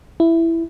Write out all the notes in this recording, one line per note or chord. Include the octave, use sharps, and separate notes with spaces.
E4